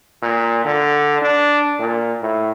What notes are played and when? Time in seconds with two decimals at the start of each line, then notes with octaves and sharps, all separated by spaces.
0.22 A#2
0.65 D3
1.22 D4
1.79 A#2
2.21 A2